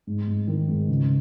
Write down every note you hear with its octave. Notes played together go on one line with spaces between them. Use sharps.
G#2
G#2
D#3
G#2
C#2